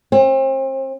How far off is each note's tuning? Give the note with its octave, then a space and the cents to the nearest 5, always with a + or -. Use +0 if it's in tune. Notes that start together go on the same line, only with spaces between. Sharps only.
C4 +35